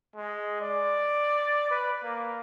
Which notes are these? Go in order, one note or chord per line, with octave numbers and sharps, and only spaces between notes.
G#3
D5
B4
A#3